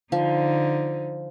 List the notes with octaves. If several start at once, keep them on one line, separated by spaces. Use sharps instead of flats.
D3 F3 D#4